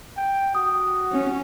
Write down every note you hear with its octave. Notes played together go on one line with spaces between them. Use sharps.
G5
F#4 D#6
C#4